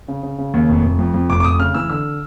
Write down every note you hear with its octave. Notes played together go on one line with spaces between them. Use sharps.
C#3
C#3
C#3
D#2
F1
F1
F2
F2
F1 D6
D6
F1 D#6
C#3 F6
E3 E6
D3 E6